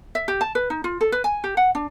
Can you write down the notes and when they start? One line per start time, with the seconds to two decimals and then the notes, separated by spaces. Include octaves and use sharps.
0.15 E5
0.28 G4
0.41 A5
0.55 B4
0.70 D#4
0.84 F4
1.01 A4
1.12 B4
1.24 G#5
1.44 G4
1.57 F#5
1.75 D4